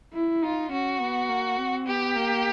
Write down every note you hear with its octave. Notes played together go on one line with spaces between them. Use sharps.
E4
D#4 F4
C#4 F#4
B3
A#3
C4
B3 G4
A#3